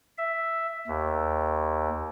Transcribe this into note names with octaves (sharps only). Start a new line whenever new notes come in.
E5
D#2